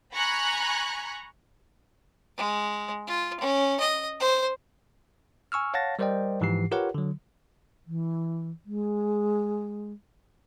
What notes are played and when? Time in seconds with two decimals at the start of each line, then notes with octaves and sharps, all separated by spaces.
0.13 G#5 A#5 B5 C#6 F#6 G#6
2.37 G#3
3.07 F4
3.40 C#4
3.80 D#5
4.20 C5
5.52 G#5 C#6 E6 F6
5.74 C#5 F5 F#5 A5 A6 A#6
5.99 G3 A#4 C5 D5 D#5 G5
6.41 G#2 E3 F3 G4 C7
6.71 F4 G4 A#4 B4 C#5 F#5
6.94 D3 F#3
7.86 E3
8.65 G#3